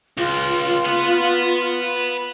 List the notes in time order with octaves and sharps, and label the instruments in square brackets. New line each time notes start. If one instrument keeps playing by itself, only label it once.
[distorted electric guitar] C#2 [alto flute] F4
[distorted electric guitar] B4 F#5